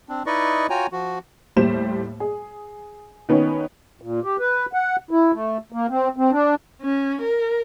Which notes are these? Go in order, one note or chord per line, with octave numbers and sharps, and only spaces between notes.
C4 D4
D#4 E4 B4 D5 D#5 C#6
F4 F#4 C#5 G5 G#5 A#5
F3 F#4
D#2 A2 G3 C5 E7
G#4
D#3 B3 C#4 D#4
A#2
G4
B4
F#5
E4
A3
A#3
C4
C4
D4
C#4
A#4